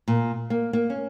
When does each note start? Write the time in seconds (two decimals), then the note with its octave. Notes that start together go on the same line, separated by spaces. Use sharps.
0.08 A#2
0.50 A#3
0.73 A#3
0.90 C#4